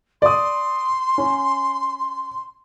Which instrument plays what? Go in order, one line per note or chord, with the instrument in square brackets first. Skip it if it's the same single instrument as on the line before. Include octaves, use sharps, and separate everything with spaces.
[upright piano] D5 D#6 [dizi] C6
[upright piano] C#4